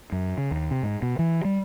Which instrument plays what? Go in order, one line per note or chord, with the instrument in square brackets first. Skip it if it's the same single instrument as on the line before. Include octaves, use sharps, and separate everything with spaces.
[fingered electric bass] F#2
C#3
D#2
C3
G#2
B2
E3
G3